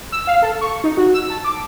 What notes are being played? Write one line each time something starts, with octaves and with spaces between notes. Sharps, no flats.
E6
F5
A4
C#6
D#4
F#4
E6
A5
D6